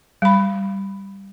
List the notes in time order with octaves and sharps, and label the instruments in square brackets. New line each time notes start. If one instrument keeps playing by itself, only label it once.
[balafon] G3 B5